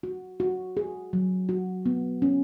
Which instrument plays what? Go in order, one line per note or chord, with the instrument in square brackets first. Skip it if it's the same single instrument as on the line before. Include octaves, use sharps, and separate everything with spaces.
[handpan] F#4
F#4
G#4
F#3
F#4
B3
C#4